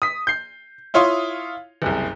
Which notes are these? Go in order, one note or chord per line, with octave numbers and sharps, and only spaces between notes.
D#6 B6
G6 C7
E4 F4 C#5 F5 C6 D#6
F#1 C2